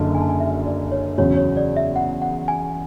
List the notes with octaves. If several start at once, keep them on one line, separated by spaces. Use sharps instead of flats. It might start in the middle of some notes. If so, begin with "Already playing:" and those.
Already playing: F#1 F#2 D3 A5
G#5
A5
G#5
E5
D5
C#5
E2 C#3 F#3 C#5
C#5
D5
E5
F#5
F#5
G#5